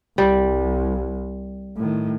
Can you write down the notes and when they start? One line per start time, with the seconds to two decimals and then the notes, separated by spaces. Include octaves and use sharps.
0.18 C2 G3
1.77 A2 D#3